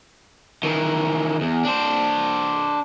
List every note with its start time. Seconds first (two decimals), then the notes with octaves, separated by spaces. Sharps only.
0.63 D#3 E3
1.41 E2
1.65 D4 C5